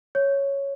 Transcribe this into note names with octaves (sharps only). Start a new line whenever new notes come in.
C#5